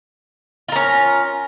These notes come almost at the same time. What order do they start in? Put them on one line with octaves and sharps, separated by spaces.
F4 A#4 C#4